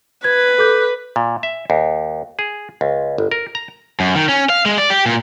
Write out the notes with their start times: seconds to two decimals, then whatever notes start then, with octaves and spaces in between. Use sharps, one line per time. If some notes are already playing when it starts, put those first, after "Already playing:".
0.24 B4 G#6
0.58 A4 D6 G6
1.16 A#2
1.43 E5
1.70 D#2
2.39 G#4
2.81 C#2
3.18 G1
3.31 A#4
3.55 A#5
4.00 F#2
4.15 D#3
4.29 C#4
4.50 F5
4.66 G#3
4.78 D5
4.90 G4
5.06 A#2